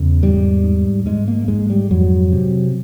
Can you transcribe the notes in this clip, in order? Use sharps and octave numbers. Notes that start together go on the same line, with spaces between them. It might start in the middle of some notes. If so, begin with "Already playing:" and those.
Already playing: E2 C#3
G#2 G3
G#2
G#2 G#3
A#3
G#2 G#3
G3
F2 F#3
C3